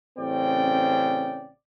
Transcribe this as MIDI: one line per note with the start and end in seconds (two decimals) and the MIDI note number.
0.18 1.49 33
0.18 1.49 49
0.18 1.49 60
0.18 1.49 74
0.18 1.49 79